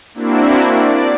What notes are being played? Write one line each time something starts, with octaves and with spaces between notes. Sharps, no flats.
A#3 C4 D4 E4 F#4
D5